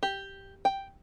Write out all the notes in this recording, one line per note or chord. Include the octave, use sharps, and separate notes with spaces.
G4
G5